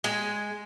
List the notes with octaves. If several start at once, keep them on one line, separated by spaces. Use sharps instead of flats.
G#3